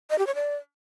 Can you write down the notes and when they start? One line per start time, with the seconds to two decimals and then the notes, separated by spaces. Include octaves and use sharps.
0.10 D#5
0.18 G4
0.27 C#5
0.35 D5